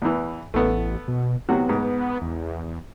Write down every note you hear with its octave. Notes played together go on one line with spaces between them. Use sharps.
E2 E3
A1 A3 B3
B2
C3 F#3 B3 F#4
G#2
E2